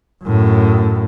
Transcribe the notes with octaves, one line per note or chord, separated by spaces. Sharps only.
F#2 A2